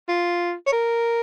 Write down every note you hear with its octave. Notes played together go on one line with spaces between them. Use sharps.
F4
C#5
A#4